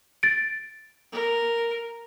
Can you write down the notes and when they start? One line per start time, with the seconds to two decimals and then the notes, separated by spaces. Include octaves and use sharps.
0.23 A6 D7
1.12 A#4